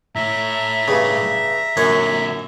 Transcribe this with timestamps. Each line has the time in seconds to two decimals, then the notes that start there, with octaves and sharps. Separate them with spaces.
0.15 A2 C#5 E5 A#5
0.88 G2 C#3
1.77 F#2 A#2 D3 C#5 F#5